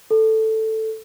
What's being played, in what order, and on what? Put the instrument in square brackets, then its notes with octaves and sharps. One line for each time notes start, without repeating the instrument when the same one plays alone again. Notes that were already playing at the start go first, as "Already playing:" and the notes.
[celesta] A4